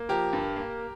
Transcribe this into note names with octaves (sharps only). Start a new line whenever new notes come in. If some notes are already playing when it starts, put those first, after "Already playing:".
Already playing: A#3
F3 G4 A#4
G2
A#3